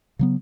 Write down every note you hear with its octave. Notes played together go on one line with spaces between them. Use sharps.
C#3 F#3 B3